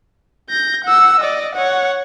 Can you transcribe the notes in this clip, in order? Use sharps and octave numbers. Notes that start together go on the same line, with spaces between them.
G6 A#6
F#5 E6
D5 D#5
C#5 F#5